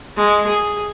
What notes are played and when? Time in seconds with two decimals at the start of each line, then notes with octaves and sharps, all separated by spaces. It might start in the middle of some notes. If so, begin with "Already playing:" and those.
0.17 G#3
0.47 G#4